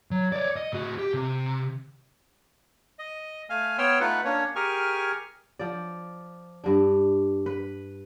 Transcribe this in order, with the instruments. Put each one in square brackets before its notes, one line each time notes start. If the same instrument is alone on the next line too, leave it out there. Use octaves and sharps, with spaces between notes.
[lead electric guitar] F#3
C#5 D5
D#5
A2 F#4
G4
C3
[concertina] D#5
A3 F5 G#5 F6
B3 C#5 G5 C6 E6 F6
A3 D#4 F4 B4 F#5
A#3 C#4 D4 C#5
G4 G#4 A#4 G#5 C#6 F6
[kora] F3 D5
G2 D4
B4